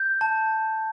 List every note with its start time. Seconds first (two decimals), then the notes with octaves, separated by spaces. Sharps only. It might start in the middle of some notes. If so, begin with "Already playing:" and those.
Already playing: G6
0.21 A5